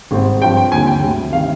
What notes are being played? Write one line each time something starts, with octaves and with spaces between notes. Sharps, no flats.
G#1 G#2 G3 C4
G2 F3 C4 G5
G5
D#2 D3 G3 G#5
G5
D2 C3 G3
C3 D#3 F5